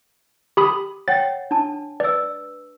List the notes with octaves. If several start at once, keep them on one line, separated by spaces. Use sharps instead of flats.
G4 B5 D#6
C#5 F#5 G5 A6
D4 A5
B4 D5 E6